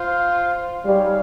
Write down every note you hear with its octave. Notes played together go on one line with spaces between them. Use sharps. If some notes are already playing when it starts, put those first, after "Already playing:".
Already playing: F4 C5 F5
G3 D#4 G#4 C#5 F5